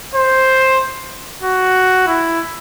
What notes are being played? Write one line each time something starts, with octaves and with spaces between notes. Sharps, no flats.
C5
F#4
E4